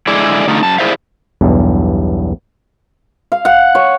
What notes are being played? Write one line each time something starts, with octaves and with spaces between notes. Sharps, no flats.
D3 G#3 E4 G#4 D5
D3 A3 D#4 F4 A4
F#2 A5
E4 G#4 C5 D5 E5 F5
B1 E2 G2
F5
F#5
C#5